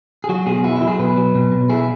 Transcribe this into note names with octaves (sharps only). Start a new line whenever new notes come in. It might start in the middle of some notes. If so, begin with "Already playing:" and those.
G#4
F#3 F#4
B2 G#4
E4 F#4
E4
F#3
G#4
B2 B4
F#3
B2
B2
E4 G#4